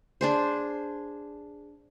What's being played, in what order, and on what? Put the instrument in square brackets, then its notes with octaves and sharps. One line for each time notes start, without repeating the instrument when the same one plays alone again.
[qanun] D4 G#4 C5